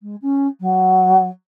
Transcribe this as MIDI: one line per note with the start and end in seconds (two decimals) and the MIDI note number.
0.01 0.15 56
0.21 0.47 61
0.60 1.27 54